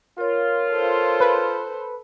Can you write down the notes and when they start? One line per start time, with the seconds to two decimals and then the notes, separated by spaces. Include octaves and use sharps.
0.18 F4 A#4 C#5
0.71 A4 C5
1.20 B4